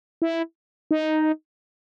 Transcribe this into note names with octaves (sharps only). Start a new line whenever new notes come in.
E4
D#4